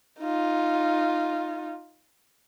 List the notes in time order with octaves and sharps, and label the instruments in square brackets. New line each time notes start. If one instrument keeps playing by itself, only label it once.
[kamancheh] D#4 F4